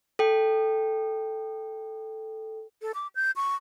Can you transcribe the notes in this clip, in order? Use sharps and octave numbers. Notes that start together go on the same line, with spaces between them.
A4 G5
A4
D6
G6
C#6